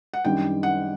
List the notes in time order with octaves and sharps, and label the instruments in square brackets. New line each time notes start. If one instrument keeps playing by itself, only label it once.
[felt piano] F#5
[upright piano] F#2 D#3 G3 D4 [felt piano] G5
[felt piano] F#5